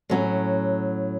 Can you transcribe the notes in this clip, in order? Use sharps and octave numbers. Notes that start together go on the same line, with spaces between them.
A2 F#3 C#4